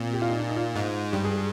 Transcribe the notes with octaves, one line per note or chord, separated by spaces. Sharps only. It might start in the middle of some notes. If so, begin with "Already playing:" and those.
Already playing: A#2 C4
G4
F4
D#4
D4
D#4
F4
G#2
G2 G4
G#4
G#4